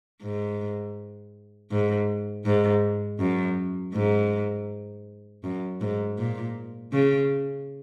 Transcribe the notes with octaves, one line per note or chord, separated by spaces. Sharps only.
G#2
G#2
G#2
F#2
G#2
F#2
G#2
A#2
C#3